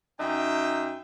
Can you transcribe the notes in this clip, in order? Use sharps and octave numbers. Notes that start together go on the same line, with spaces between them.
F#2 D#4 E5 G5